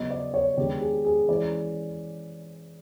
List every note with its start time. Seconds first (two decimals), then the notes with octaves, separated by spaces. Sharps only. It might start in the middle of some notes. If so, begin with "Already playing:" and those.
Already playing: C#3 F#3 B3 D#5
0.10 D5
0.34 C#5
0.57 D#3 G#3 B3 D4 G4
0.81 G#4
1.05 G#4
1.28 E3 G#3 C#4 D5